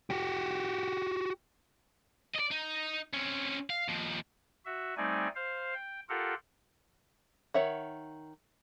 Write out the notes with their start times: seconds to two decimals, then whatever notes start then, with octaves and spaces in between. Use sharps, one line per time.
0.10 F#4 G4
2.34 D5 D#5
2.51 D#4
3.14 C4 C#4
3.70 F5
3.89 D#2 F3
4.65 F#4 E5
4.97 G3 A3 C4 D#4 D5 G#5
5.35 C5 F5
5.74 G5
6.09 F4 G4 A4 A#4 F#5
7.54 D#3 C#5 E5 F#5